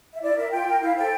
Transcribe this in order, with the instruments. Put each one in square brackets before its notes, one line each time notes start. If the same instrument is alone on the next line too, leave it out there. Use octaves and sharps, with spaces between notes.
[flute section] E5
E4 D5
A#4 E5
F4 G5
A#4
E4 F5
A4 C5 G5